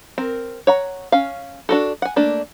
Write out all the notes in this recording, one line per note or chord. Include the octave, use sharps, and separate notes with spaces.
C4 A#4
C#5 F#5 A#5
C#4 F5
D4 F#4 A4
F#5 G#5
A3 A#3 D4